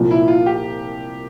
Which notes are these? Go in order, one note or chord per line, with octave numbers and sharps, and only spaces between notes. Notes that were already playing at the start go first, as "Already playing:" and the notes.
Already playing: C2 A#2 F3
E4
F4
G4